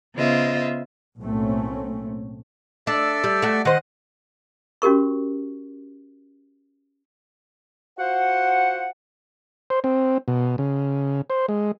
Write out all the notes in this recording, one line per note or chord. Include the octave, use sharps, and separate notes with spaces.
C#3 B3 F4 C5 D#5 E5
B1 A2 A3 A#3 C4 C#4
D4 A4 D5 E5
G3
A3 F#4
D#3 C5 D#5 F#5
C#4 F#4 G4 A#4 C#6
F4 F#4 C5 F#5
C5
C4
B2
C#3
C5
G#3